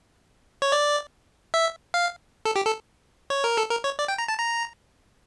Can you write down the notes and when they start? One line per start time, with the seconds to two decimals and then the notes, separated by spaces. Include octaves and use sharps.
0.62 C#5
0.72 D5
1.54 E5
1.94 F5
2.45 A4
2.56 G4
2.66 A4
3.30 C#5
3.44 A#4
3.57 A4
3.70 A#4
3.84 C#5
3.99 D5
4.08 G5
4.18 A#5
4.28 A5
4.39 A#5